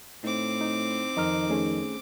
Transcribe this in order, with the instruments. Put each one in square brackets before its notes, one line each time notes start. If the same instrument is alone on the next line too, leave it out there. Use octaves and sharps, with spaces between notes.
[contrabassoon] A2 [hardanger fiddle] C4 D6 [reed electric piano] D#4
[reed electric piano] D#4
[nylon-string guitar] F2 [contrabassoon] D#3 [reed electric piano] D#5 A#5 F6
[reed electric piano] A3 C#4 G#4